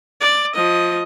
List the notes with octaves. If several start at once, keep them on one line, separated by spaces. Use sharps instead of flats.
D5
F3 D#5